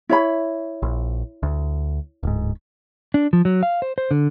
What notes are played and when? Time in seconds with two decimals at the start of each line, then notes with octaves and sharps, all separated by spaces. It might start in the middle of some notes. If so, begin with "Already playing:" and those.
0.09 E4 C#5 B5
0.82 A#1
1.43 D2
2.23 D1 G#2
3.14 D4
3.33 F3
3.45 F#3
3.63 F5
3.82 C5
3.98 C5
4.11 D3